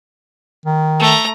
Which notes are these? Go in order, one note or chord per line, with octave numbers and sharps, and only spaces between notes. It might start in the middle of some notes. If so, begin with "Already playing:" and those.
D#3
A3 A#5